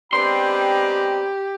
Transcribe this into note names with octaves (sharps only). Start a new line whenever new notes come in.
G#3 B3 C4 D4 G4 G5 A#5 C6